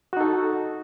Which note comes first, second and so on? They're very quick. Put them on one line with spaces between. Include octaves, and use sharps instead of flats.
F#4 D#4 A4